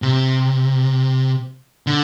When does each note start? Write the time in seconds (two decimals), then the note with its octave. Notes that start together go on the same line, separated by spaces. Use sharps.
0.02 C3
1.87 D3